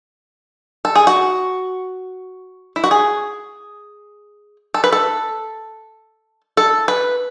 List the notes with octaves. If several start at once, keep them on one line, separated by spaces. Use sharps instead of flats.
A4
G#4
F#4
E4
F#4
G#4
A4
B4
A4
A4
B4